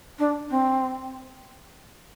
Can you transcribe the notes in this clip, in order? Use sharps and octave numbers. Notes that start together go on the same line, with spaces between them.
D4
C4